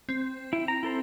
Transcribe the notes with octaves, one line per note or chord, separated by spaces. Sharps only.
C4
E4
A#5
E4 A4 C5